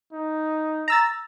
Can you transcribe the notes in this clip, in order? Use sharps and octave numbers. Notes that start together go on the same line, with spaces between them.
D#4
A#5 E6 A6